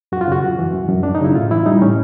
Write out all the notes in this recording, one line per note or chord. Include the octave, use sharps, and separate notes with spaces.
F#2 F#4
F4
C#3 F#4
F#2
E3
F#2
F#2
F#2 D4
D#4
C#3 E4
A2 F4
E3 E4
G3 D#4
A2 C#4